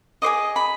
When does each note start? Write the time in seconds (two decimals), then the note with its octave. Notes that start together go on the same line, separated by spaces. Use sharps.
0.22 G#4 C5 D#5 D6
0.56 B5